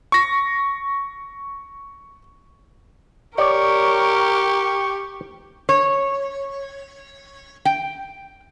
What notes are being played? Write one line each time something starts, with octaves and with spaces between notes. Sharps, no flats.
C#6 A#6
G4 A#4 C#5 D5 C#6
C#5
G5